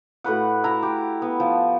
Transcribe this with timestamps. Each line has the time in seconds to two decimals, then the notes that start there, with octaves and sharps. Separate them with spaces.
0.24 A2 F#4 B4 F#5
0.64 E4 A#5
0.83 G4
1.22 B3
1.40 F3